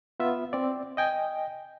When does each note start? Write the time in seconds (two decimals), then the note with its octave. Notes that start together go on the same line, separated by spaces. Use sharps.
0.20 B3 F4 E5
0.53 C4 D5
0.97 D#5 G5 G#5